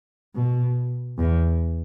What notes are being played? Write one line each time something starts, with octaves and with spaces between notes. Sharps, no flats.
B2
E2